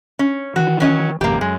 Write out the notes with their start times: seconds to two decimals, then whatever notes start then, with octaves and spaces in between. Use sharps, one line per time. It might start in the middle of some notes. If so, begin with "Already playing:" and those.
0.19 C#4
0.56 D#3 E3 F#4
0.80 F#3 C#4 D#5
1.21 G#1 F2 C#3 A#3 G4
1.41 F#2 G#3